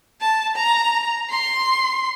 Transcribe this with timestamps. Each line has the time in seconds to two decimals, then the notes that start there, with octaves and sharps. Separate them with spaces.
0.21 A5
0.56 A#5
1.30 C6